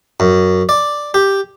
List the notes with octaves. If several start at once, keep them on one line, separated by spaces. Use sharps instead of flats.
F#2
D5
G4